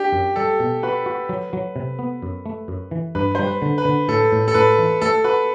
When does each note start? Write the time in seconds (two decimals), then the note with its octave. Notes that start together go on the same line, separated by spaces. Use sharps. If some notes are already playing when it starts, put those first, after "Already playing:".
Already playing: D4 G4
0.12 F#2
0.36 G3 A4
0.60 B2
0.83 F#4 B4
1.06 F#4
1.29 F#3
1.53 F#3
1.76 C3
1.99 B3
2.22 F#2
2.46 A3
2.68 F#2
2.91 E3
3.15 G2 B4
3.35 G3 C5
3.47 B4
3.62 D3
3.78 B4
3.85 D3
4.08 A2 A4
4.32 A2
4.48 A4
4.54 A2 B4
4.79 E3
5.01 A3 A4
5.24 F#4 B4